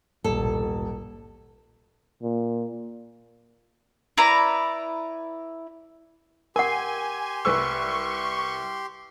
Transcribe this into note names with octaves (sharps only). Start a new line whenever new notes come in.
D#1 A#1 G#2 B2 A4
A#2
E4 B4 D5 A#5
G4 A#4 F#5 G#5 C6
C2 B4 C#6 E6